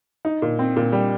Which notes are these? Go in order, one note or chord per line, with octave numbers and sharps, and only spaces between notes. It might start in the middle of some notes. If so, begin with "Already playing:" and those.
D#4
A#2
C4
A#2
G3